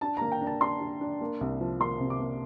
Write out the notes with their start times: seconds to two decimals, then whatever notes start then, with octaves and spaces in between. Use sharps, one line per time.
0.01 D4 A5
0.17 A#3 A#5
0.32 G5
0.41 D4
0.47 A5
0.61 D4 C6
0.81 D4
1.01 D4
1.21 A#3
1.41 C2
1.60 F3
1.80 A#3 C6
2.00 C3
2.10 D6
2.19 A#3